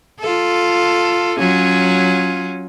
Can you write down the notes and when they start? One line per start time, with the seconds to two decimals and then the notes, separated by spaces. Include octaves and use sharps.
0.20 F4 A4
1.39 F#3 C#4 F4